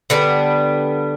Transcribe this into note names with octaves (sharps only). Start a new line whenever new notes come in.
D3 G3 B3 D4